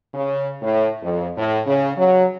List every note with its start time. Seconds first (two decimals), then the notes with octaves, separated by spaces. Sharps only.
0.14 C#3
0.62 A2
1.02 F2
1.37 A2
1.66 C#3
1.96 F#3